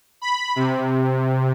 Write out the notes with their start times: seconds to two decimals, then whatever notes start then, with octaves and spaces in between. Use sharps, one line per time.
0.22 B5
0.56 C3